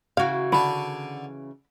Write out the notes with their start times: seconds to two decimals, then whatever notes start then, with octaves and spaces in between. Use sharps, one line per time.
0.17 C#3 E3 F#4 F5
0.52 D3 D4 B5